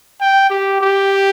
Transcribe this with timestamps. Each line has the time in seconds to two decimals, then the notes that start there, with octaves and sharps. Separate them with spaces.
0.21 G5
0.50 G4
0.81 G4